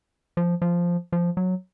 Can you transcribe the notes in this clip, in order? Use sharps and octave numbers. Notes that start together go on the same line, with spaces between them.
F3
F3
F3
F#3